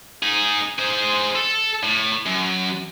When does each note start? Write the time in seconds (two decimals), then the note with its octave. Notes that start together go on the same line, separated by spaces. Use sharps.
0.23 D#4 G#4
0.79 G#4 C5
1.35 A4
1.83 A2
2.26 F#2